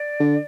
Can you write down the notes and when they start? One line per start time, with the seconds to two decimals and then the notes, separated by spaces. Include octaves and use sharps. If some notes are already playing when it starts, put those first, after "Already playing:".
Already playing: D5
0.20 D3